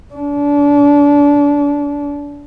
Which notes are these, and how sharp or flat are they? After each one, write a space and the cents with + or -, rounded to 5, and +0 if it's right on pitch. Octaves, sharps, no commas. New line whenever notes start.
D4 -30